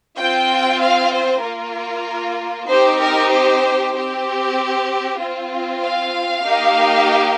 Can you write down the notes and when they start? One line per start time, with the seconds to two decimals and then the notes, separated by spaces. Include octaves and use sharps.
0.18 C4 F4 G5
0.82 F5
1.13 C5
1.43 A#3 F4 A#4
2.68 C4 D#4 G4 C5
3.01 A#4
3.31 C5
3.95 C4 G4
5.19 C4 F4
5.82 F5
6.45 A#3 D#4 G4